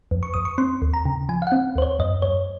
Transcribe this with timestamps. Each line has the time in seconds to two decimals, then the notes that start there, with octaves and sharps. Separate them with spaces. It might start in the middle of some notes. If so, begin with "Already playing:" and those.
0.11 F2
0.23 C#6
0.34 F2 D#6
0.45 C#6
0.58 C4 C6
0.82 D#2
0.94 A#5
1.05 C#3
1.29 F3 G#5
1.42 F5
1.47 C4 F#5
1.75 D#2 C5
1.82 C#5
1.99 F#2 D#5
2.22 F#2 C#5